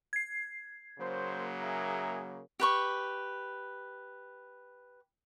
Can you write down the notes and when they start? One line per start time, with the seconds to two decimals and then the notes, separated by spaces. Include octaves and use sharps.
0.13 G#6 C7
0.99 C#3 F#3 A#3 C5
1.63 G#4 E5 A#5
2.60 G4 B4 C#6